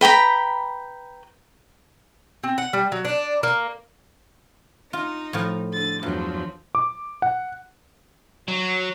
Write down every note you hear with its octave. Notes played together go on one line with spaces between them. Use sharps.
B4 G5 A#5 B5
C4
F#5
G3
F#3
D4
A#3
D#4 F4
A2 F3
D3 A6
E2 G2 F3 F#3
D6
F#5
F#3